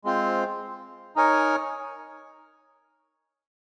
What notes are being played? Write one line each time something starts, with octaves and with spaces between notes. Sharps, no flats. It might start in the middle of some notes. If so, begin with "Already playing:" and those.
G#3 C4 F4 C5
D#4 A#4 C#5 G#5